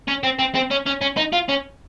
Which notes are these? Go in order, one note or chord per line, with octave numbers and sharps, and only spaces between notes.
C#4
C4
C4
C4
C#4
C#4
C#4
D#4
F4
C#4